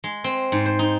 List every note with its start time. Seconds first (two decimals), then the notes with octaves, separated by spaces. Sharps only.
0.04 G#3
0.24 C4
0.52 G#2
0.66 C5
0.79 D#4